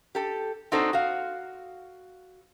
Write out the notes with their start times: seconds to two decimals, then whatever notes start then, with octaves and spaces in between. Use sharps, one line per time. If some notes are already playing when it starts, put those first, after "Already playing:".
0.15 G4 A4
0.72 C4 D4 D#4 F#4 A4 C5
0.93 F#4 F5